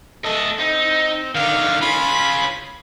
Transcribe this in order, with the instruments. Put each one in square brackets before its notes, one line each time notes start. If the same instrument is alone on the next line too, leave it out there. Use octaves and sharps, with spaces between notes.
[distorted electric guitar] A3 D#5 [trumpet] A4
[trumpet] C4 [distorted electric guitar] D#4
[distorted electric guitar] D3 D#3 [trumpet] F5
[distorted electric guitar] C#4 F4 [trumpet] B5